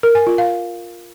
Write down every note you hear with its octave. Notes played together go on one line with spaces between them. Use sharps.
A#4
G#5
F4
F5